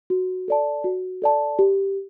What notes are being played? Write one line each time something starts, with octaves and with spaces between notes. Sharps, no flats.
F#4
A4 D5 A5
F#4
A4 D5 A5
G4